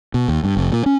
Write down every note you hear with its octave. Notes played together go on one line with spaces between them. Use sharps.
B2
D#2
G2
F1
A#2
C#4